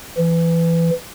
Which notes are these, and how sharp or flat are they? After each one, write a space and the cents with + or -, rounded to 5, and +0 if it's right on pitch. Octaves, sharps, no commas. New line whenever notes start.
E3 +20